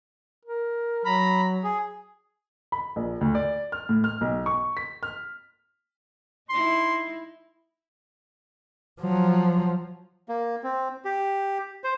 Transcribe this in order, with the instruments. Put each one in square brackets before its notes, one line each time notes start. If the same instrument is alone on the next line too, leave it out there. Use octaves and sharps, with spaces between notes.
[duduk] A#4
[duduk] F#3 [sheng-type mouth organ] A#5 B5
[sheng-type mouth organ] G#4
[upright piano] B5
A#1
D2
D5
F6
A2
F6
B1
C#6
B6
F6
[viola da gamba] D#4 E4 [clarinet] C6
[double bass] F3 F#3
[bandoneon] A#3
C4
G4
C5